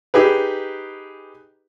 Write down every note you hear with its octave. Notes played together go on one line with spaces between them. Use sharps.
D#4 G4 G#4 B4